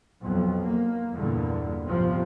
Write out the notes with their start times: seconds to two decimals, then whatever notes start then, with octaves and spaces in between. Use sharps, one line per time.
0.22 B1 F2
0.64 A#3
1.13 E2 G2 A#2 D3
1.85 G1 A2 C3 F3